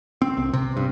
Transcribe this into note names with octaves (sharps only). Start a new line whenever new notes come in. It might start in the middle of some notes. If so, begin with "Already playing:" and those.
C4
C2
C3
G2